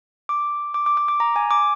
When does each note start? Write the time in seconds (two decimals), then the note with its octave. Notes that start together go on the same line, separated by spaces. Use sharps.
0.29 D6
0.74 D6
0.86 D6
0.97 D6
1.08 D6
1.20 A#5
1.36 G#5
1.51 D6